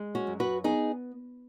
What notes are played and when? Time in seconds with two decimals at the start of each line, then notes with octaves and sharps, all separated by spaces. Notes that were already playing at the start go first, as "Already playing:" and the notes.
Already playing: G#3
0.15 C#4 F#4
0.27 F#2
0.40 F#4 B4
0.64 B3 D#4 G#4